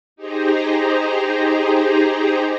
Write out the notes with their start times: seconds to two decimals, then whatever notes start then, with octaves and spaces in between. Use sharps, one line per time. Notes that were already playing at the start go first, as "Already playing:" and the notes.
0.16 D#4 G4 G#4 C5 A#5